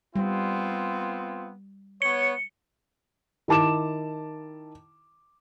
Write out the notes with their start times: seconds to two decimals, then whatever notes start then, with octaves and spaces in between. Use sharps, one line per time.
0.16 G3 B3 C4 F4
2.02 B3 C#5 C#7
3.48 D#3 E4 A5 D6 E7